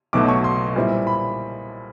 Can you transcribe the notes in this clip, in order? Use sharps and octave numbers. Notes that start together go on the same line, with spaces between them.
B1 B2 F#3 A3 D6
C#6
C6
A#2 G3 C4 E4
B5